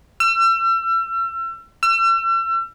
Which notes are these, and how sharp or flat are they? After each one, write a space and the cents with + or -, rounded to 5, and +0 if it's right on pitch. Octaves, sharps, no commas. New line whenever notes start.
E6 +40
E6 +40